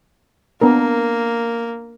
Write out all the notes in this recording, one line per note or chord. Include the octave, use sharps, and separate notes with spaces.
A#3 B3 D4 A#4